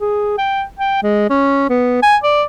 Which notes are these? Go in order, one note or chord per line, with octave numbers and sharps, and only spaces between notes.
G#4
G5
G5
G#3
C#4
B3
G#5
D5